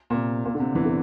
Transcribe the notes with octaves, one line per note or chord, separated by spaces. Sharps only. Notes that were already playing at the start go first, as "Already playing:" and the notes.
A#2
C3
A#2
D3
C3
E2 E3
D3